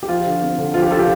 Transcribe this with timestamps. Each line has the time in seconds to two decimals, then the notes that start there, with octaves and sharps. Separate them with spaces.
0.03 G4
0.09 F3 F4
0.26 D3
0.42 C4
0.58 D3
0.74 F3 F4
0.82 G4
0.91 D3 F4 A4
0.99 G4